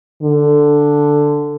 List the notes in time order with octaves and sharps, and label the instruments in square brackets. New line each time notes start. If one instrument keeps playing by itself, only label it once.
[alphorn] D3